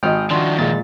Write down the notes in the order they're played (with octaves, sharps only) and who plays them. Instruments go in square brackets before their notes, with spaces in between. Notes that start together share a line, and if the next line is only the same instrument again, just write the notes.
[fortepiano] G#1 D#5 [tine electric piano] G5 F6
[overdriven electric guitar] D#3 F3 [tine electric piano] D4 F#4 [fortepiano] C6
[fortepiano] A#2 [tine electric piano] G#3 A6